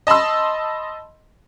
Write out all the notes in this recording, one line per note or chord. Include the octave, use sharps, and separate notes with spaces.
D#5 A5 B5 C6 E6